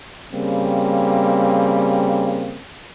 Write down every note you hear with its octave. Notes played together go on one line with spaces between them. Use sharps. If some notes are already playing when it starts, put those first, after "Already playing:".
C#3 G3 A#3 C4